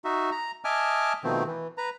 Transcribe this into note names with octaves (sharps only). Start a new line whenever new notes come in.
D#4 F#4 E5
A#5
D#5 E5 G#5 A5 D6 F6
B2 D#3 F3 A3 C4
E3
B4 A#5